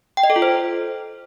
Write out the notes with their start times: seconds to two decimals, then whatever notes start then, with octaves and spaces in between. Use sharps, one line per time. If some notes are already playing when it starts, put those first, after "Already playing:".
0.17 G5
0.23 D#5
0.30 A4
0.36 F4
0.42 C5